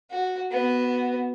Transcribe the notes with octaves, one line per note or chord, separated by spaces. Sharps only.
F#4
B3 F#4